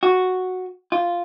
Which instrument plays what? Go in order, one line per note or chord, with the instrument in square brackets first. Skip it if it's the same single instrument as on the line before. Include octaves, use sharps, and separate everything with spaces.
[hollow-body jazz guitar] F#4
F4